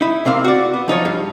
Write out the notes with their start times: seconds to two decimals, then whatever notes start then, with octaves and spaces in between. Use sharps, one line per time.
0.01 D#4 E4
0.25 C3 A#3 C4 F5
0.44 F#4 D5
0.74 B3
0.88 F3 D#4 F4 C#5
1.05 G2